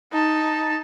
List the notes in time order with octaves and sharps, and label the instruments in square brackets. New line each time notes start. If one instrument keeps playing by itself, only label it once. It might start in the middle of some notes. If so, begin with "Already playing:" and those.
[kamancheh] D#4 A5